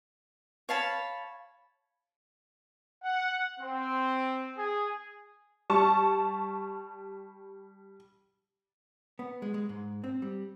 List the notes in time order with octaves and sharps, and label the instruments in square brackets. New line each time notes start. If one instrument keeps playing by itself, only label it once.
[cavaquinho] C#5 F5 A5 B5
[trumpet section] F#5
C4
G#4
[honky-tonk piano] G3 A5 C#6
[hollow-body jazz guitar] B3
G#3
G#3
G#2
C4
G3